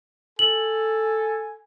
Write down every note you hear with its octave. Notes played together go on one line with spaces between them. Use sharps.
A4 G#5 F#7